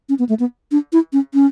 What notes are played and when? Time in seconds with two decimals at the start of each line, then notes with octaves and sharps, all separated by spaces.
0.09 C#4
0.19 B3
0.29 A3
0.40 B3
0.72 D4
0.93 E4
1.13 C#4
1.34 C#4